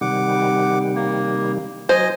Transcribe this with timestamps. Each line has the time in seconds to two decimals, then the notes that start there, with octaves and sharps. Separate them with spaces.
0.01 C3 D#3 G3 F#5 D6
0.96 A#3
1.89 F#3 C5 D#5 G#5